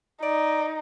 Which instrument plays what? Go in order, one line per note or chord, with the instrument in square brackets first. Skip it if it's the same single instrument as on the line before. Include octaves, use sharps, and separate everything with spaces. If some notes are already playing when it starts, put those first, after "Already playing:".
[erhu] D#4 [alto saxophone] D5